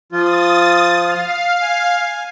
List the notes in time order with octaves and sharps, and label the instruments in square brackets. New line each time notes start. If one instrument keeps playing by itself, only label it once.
[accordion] F3 F4 [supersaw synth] D#6 A6
[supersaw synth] F5
[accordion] G#5